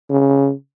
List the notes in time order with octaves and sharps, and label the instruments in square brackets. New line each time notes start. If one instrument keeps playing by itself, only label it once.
[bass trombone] C#3